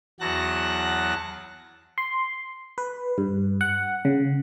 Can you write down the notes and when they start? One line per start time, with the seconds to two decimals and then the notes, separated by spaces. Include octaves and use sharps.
0.20 E2 F#3 F#4 A5 F#6 A#6
1.98 C6
2.78 B4
3.18 G2
3.61 F#5
4.05 C#3